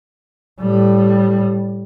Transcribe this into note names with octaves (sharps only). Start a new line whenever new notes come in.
A2 G3